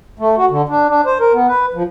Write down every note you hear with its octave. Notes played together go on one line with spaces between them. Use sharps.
A3
F#4
D3
D4
D4
C5
A#4
B3
B4
F3